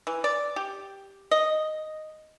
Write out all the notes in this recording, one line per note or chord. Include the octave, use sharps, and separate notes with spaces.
E3
D5
G4
D#5